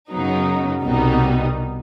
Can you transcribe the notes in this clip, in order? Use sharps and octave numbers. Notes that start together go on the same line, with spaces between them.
F#2 C#3 F#3 B3 D#4
C2 B2 G3 B3 D#4